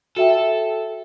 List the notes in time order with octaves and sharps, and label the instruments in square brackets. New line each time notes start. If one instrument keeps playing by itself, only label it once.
[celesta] F#4 E5 G5 [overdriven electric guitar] A4